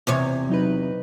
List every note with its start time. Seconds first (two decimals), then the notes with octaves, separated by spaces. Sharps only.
0.07 E2 C3 C#5
0.49 F#3 D#4 B4